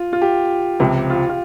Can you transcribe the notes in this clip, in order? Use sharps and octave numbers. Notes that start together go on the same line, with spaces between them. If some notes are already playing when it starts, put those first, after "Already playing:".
Already playing: F4
F4
G4
C#2 C3 F3 G4
F4
F4